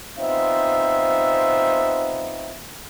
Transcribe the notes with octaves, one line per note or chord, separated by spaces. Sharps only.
B3 C4 D#4 F4 C5 E5